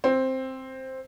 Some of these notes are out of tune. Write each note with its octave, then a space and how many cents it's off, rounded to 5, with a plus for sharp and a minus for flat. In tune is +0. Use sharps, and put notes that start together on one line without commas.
C4 +5